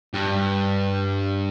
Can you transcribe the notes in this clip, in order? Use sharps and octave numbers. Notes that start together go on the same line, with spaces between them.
G2